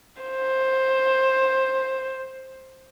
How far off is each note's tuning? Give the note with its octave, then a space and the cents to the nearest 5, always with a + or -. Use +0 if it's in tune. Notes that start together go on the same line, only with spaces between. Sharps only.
C5 +10